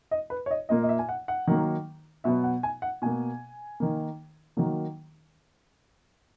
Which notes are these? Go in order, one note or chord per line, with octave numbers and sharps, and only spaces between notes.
D#5
B4
C#5
D#5
A#2 A#3 D#5
D#5
E5
G#5
F#5
F#5
D#3 F#3 A#3
B2 F#3 B3 E5
F#5
G#5
F#5
B2 A#3 G#5
D#3 A#3
D#3 F#3 A#3